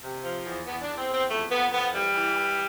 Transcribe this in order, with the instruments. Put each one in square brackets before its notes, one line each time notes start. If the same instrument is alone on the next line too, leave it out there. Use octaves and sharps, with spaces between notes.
[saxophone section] C3
F3
E2
E2 B3
D4
E2
C4
E2 C4
F2 A3
F2 B3
F2 B3
E3 G3
E3
E3